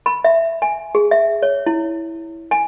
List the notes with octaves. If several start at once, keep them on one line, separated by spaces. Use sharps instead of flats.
B5
E5
G#5
G#4
E5
C#5
E4
G#5